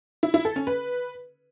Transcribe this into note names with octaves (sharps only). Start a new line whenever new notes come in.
E4
E4
A4
C#4
B4